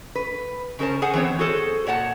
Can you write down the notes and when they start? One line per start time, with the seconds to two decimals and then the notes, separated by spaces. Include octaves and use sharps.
0.15 B4
0.79 C#3 C#4 A#4 C5 A5
1.02 G#4 A4 C5 F#5 G#5
1.13 E3 B3 C4 C5 C#5
1.39 F#4 G#4 A4 C5
1.87 A#2 C#5 F#5 A5